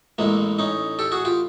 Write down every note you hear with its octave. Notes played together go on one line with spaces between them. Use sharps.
A1 A2 E3 G#3 A#3
C#4 D#4
G4 A4
F#4 G#4
F4 G4